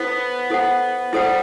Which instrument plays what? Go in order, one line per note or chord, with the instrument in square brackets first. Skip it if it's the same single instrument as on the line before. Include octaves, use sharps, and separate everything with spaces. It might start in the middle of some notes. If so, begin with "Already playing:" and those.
Already playing: [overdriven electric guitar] B3 [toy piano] E4 A4 C5 F#5
[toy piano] E4 A4 C5 F#5
[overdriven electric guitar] G3 [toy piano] E4 A4 C5 F#5